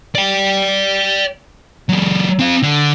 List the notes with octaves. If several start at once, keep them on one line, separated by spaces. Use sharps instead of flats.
D5 G5
F#3 G#3
C4 F5
D3